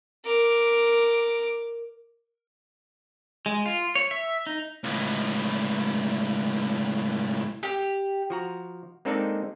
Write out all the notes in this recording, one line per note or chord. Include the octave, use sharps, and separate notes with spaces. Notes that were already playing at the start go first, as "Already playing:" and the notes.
A#4 D6
G#3
F4
C#5
E5
D#4
C#2 A2
G4
F3 F#4 A#5
G#3 A#3 C4 D4 D#4 A4